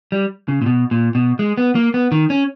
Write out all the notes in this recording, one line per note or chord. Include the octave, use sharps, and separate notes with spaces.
G3
C#3
A#2
B2
A#2
B2
G#3
B3
A#3
B3
D#3
C#4